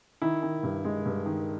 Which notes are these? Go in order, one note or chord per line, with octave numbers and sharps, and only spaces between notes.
D#3 E4
D#3
G2
G#3
G2
D#3